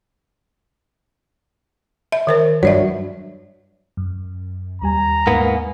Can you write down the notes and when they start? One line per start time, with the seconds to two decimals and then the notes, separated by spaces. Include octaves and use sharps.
2.12 E5
2.27 D#3 A#4 C5
2.63 G2 F#3 C#5 D5 E5
3.97 F#2
4.82 D#2 G3 G#5 A#5
5.27 G#2 A#3 B3